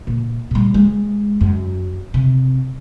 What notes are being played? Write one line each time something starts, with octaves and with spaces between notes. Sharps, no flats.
A#2
A#2 G3
G#3
F#2
C3